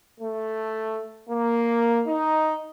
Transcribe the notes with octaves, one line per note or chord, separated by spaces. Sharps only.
A3
A#3
D#4